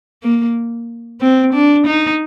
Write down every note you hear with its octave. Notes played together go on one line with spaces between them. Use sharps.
A#3
C4
D4
D#4